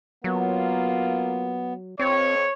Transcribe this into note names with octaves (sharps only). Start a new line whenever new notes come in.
F#3 A#3 B3 F4
F2 C4 C#5